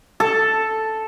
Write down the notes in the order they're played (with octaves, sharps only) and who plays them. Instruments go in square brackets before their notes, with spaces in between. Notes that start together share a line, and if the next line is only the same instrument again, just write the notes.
[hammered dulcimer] A4